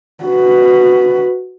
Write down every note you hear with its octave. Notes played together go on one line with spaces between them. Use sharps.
F#4 B4